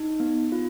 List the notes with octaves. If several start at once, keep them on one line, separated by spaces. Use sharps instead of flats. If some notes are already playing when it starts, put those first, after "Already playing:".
Already playing: D#4
B3
F4